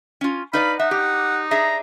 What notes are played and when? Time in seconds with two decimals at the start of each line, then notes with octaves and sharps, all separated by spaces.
0.21 C#4 F4
0.53 D#4 B4 D5 F5 B5
0.79 D#4 E5 F#5
0.91 G4
1.51 D4 G#4 E5 A#5